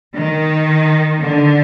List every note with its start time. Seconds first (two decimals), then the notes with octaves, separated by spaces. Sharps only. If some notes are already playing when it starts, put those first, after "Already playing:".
0.15 D#3
1.22 D3